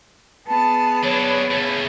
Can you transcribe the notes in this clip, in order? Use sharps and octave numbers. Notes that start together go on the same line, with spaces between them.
B3 G#4 A5
F#3 D4 C#5
C#3 A3